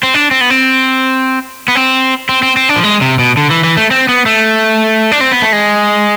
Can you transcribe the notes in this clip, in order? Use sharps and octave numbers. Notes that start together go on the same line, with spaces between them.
C4
D4
C4
B3
C4
B3
C4
C4
C4
C4
D4
F3
G#3
C3
B2
D3
E3
E3
A3
C4
B3
A3
D4
C4
B3
A3
G#3